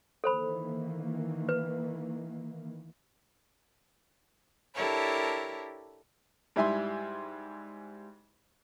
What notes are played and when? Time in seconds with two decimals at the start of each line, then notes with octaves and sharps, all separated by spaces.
0.24 D#3 E3 A#3 A4 C5 B5
1.49 B4
4.75 D4 E4 G4 A4 A#4 C#5
6.56 G#2 G3 E4 E5 G#5 C6